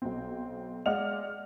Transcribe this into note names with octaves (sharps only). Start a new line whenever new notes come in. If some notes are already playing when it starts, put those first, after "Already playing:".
B1 C4
G#3 D5 D#5 F#5 F6 F7